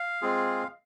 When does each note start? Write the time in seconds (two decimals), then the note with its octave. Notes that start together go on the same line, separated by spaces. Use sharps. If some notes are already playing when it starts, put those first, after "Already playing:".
Already playing: F5
0.22 G#3 C4 F4 G#4